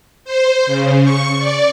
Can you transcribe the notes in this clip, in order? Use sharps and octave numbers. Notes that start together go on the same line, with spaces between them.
C5
C#3
C#6
D5